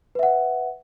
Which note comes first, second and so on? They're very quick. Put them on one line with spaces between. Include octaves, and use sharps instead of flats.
B4 E5 F#5